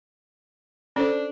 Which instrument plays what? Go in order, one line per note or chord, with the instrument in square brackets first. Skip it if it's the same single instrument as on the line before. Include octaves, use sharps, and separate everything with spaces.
[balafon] C#4 A4 C5 [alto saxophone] D4